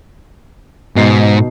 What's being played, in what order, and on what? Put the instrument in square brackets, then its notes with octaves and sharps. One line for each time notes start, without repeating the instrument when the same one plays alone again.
[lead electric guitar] G#2 [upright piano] B2 D#4 C7